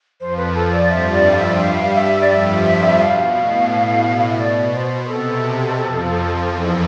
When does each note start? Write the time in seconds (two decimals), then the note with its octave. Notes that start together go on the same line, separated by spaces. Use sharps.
0.20 F2 F3 C5
0.37 B4
0.55 A4
0.72 D5
0.89 G2 G3 E5
1.13 D5
1.32 F5
1.36 E5
1.59 G2 G3 F5
1.95 E5
2.21 D5
2.29 F2 F3 E5
2.99 B2 F5
3.34 A2
3.69 B2
4.19 F5
4.29 E5
4.39 B2 D5
4.74 C5
5.04 B4
5.08 C3 A4
5.78 F2 F3
6.48 E2 E3